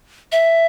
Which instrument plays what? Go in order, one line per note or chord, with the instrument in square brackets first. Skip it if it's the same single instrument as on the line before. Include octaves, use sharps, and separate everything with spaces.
[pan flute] E5